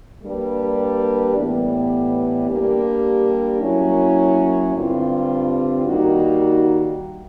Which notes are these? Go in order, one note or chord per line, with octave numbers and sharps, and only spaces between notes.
G3 A#3 D4 G4 B4
A2 E3 G3 B3
G3 A#3 D4 G4
F#3 A#3 C#4 E4
G2 D3 G3 C4 F4
D#3 G3 A#3 D#4 F#4